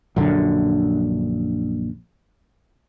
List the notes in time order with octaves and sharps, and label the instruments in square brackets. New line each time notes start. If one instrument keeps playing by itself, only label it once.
[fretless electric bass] A#1 F#2 D3